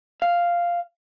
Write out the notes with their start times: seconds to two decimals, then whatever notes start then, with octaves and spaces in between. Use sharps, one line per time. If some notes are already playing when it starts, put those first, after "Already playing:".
0.22 F5